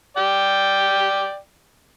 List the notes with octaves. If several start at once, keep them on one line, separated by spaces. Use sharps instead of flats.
D5 G5